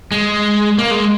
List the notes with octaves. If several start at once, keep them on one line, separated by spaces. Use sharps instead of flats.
G#3
A#3
G#3